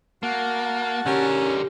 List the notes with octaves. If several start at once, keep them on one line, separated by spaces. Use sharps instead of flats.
A#3 F#4 A5
D3 C#4 G4 A#4